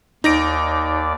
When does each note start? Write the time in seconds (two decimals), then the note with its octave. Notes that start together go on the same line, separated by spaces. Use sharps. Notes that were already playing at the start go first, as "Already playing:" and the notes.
0.24 D#2 D#4 D5 A#6 D7